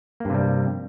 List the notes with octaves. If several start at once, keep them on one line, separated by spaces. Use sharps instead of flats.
G2 C3 G3 A#3